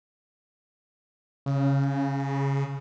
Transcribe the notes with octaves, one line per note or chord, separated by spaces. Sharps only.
C#3